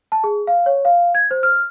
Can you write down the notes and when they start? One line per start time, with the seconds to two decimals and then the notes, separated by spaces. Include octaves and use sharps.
0.12 A5
0.24 G#4
0.47 F5
0.66 C#5
0.85 F5
1.15 G#6
1.31 C5
1.43 F6